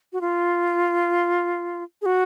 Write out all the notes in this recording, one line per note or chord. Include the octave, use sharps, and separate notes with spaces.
F#4
F4
G#4
F#4